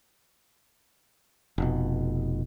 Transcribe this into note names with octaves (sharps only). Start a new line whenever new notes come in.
F1 B2